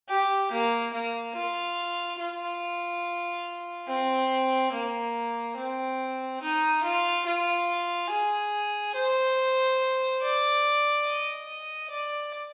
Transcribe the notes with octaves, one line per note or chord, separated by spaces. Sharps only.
G4
A#3
A#3
F4
F4
C4
A#3
C4
D#4
F4
F4
G#4
C5
D5
D#5
D5